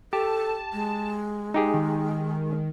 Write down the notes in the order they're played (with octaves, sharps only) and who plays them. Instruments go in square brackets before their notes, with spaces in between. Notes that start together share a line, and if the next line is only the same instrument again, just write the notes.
[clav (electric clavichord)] G4 [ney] A4 [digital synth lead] A5
[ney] G#3
[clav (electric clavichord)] D#4 G4 G#4
[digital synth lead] D#3